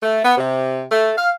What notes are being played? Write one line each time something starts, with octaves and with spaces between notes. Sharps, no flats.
A3
B3
C3
A3
F5